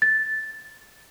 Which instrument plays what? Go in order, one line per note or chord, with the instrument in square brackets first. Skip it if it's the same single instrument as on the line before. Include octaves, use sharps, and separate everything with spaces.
[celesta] A6